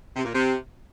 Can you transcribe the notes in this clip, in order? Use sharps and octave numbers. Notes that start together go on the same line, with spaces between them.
C3
A#2
C3